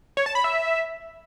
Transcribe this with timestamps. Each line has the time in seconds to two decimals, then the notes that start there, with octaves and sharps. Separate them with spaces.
0.17 C#5
0.26 A5
0.35 B5
0.44 E5